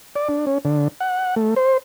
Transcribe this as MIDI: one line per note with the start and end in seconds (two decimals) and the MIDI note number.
0.16 0.28 74
0.29 0.45 62
0.47 0.58 61
0.65 0.88 50
1.01 1.35 78
1.36 1.54 57
1.56 1.77 72